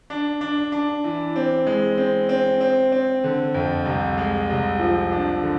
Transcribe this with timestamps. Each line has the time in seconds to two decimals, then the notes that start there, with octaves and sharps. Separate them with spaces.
0.10 D4
0.41 D4
0.72 D4
1.04 E3
1.36 C4
1.67 G#3
1.97 C4
2.29 C4
2.61 C4
2.92 C4
3.24 D3
3.54 F2
3.85 C2
4.18 G#3
4.49 C2
4.79 F3
5.12 D4
5.43 D3